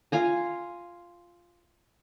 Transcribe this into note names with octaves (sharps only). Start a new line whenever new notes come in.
F4 F5 G#5 A#5